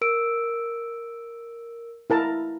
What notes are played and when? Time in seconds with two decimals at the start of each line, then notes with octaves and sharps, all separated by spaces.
0.01 A#4 E6 D7
2.10 E4 A#4 A5